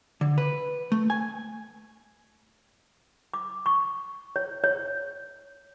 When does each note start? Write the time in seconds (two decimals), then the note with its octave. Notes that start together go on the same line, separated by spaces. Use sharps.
0.21 D3
0.38 B4
0.92 A3
1.10 G#5
3.34 D6
3.66 C#6
4.36 C#5
4.64 C#5